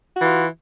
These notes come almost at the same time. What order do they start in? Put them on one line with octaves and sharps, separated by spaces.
F#4 E3 F4